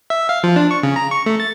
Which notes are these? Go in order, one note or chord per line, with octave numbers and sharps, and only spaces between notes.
E5
F5
F3
D4
C#6
C#3
A#5
C#6
A3
A6